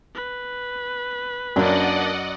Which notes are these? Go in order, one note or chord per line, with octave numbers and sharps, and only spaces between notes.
B4
F#2 A#3 C#4 D4 D5 D#5 F#5